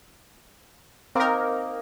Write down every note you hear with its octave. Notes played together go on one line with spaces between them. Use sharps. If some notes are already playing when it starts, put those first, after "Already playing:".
A#3 C4 D#4 A#4